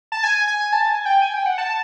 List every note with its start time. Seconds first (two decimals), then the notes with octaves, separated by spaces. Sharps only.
0.12 A5
0.23 G#5
0.47 G#5
0.73 A5
0.89 G#5
1.06 G5
1.22 G#5
1.34 G5
1.46 F#5
1.58 A5